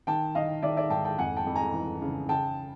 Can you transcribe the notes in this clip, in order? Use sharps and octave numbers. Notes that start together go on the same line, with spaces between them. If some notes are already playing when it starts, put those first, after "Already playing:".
D#3 G5 A5
D#3 D#5 F5
D#3 D5 E5
D5 E5
G#2 G5 A5
G5 A5
F2 F#5 G#5
G5 A5
F2
G#5 A#5
E3
C#3
C#3 G5 A5